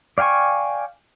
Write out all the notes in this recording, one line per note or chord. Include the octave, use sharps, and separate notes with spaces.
D5 F5 G5 G#5 C#6